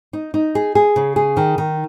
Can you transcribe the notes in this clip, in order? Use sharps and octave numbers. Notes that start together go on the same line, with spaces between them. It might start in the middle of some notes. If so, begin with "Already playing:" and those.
D#4
D#4
G#4
G#4
C#3
G#4
D#3
D#3